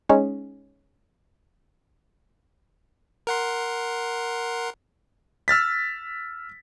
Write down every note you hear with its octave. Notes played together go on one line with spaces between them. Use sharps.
G#3 C#4 D#4
A#4 F#5 C6
E6 F6 A6 B6